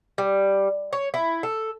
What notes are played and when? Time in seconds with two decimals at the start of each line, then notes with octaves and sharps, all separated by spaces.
0.18 G3
0.93 C#5
1.14 E4
1.43 A4